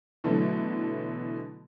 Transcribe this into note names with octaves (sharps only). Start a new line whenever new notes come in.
B2 D3 E3 F#3 A3